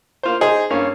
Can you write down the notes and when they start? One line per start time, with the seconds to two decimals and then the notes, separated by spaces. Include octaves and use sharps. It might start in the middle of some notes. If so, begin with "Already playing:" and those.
0.23 A#3 F4 C5
0.41 D#4 G#4 C5
0.70 G2 A#3 C#4